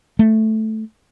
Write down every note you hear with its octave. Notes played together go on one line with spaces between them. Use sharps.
A3